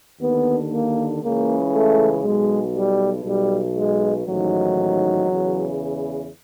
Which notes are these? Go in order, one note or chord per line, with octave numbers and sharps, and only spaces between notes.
D#2 D3 B3
A#3
C#2 C#3 E3 A#3
A3
B1 B2 G#3
G3
B1 B2 G3
G#3
A1 G#2 D#3 F#3
E2 C#3 E3